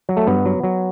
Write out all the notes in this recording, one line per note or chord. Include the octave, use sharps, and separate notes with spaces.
F#3
A3
G2 B3
F#3
F#3